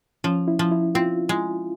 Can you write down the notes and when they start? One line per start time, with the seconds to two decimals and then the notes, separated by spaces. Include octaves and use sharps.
0.24 F3 C#4
0.48 E4
0.59 F3
0.72 E4
0.95 C4 F4
1.29 G#3